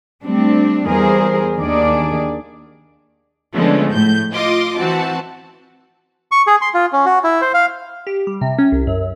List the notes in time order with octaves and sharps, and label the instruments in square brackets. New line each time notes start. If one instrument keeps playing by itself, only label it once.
[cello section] G3 A3 C4 D4
E2 E3 G3 G#4 A#4 C5
D#2 D#3 A#3 D4 G#4 D5
[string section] D3 F3 G#3 A3 B3 C#4
A2 G6
F4 D#5 C6 D6
E3 C4 F#4 A5
[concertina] C#6
G#4
C6
F4
C#4
F#4
E4
C5
F5
[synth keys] G4
G3
C3
C#4
C2
F#2